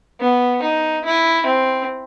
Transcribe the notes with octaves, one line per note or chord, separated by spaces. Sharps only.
B3
D#4
E4
C4